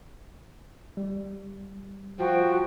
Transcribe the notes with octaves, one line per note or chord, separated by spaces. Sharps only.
G3
F3 F#4 G5